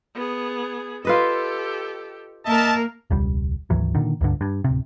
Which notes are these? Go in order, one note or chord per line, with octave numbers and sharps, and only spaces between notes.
B3 G#4
F4 G4 A4 B4 D#5
A#3 A#4 D#5 E5 A5
E1 C#2 G3
G#1 D2 E3 F#3
A#2 D3 D#3
C#2 G2 D3
G2
D1 C3